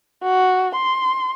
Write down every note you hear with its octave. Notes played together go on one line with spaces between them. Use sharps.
F#4
C6